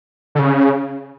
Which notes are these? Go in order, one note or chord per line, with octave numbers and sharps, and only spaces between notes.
D3
C#3